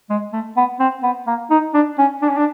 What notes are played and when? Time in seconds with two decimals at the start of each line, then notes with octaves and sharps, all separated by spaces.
0.10 G#3
0.33 A3
0.57 B3
0.80 C4
1.03 B3
1.27 A#3
1.50 D#4
1.74 D4
1.98 C#4
2.22 D4
2.29 C#4
2.37 D4